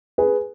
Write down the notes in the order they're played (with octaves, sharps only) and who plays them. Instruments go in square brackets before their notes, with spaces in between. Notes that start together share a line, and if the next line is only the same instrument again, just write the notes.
[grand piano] G#4 B4